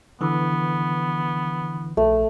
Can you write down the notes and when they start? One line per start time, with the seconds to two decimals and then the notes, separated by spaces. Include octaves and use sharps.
0.21 D3 E3 B3
1.97 A#1 A3